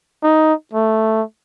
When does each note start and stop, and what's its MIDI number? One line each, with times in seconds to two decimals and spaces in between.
0.23 0.53 63
0.73 1.22 57